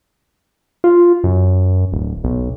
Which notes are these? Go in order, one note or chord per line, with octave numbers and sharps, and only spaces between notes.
F4
F#2
D1
B1